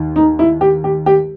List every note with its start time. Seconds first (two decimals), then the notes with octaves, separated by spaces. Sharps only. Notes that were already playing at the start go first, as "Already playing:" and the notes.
Already playing: D#2 D#3
0.16 D#4
0.39 E4
0.61 G4
0.84 G4
1.06 G4